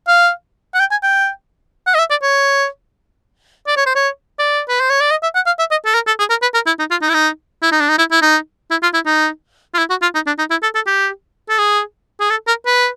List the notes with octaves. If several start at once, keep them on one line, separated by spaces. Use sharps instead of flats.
F5
F#5
G5
G#5
G5
F#5
D#5
E5
D5
C#5
D5
C#5
C5
C#5
D5
B4
C5
C#5
D5
D#5
E5
F#5
F5
E5
D#5
A4
A#4
A4
G#4
A#4
B4
A#4
E4
D#4
F4
D#4
E4
D#4
E4
D#4
D4
D#4
E4
E4
D#4
E4
F4
E4
D#4
F4
E4
F#4
F4
D#4
D4
D#4
E4
A4
A4
G4
A4
G#4
G#4
A4
A#4
B4